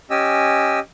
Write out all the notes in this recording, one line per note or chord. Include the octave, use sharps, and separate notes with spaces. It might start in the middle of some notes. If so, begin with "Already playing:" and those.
C#4 G4 D#5 G#5 E6